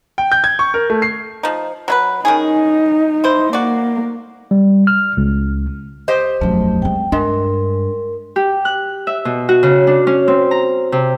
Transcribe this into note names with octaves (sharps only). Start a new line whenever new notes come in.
G5
G6
G#6
C#6
A#4
A3
C7
F3 D#4
F#3 E4 B4
D#3 C#4 D#4 G#4
E4 C5
A#3 F#4 D5
G3
F6
C#2
G4 C5 D#5
E1 B1 F#2 F3 F#3 A3
G#3 C4 G5
G2 G#3 D4 A#4
G4
F#6
E5
B2
F#4
C#3
D4
C#4
C4
A#5
C3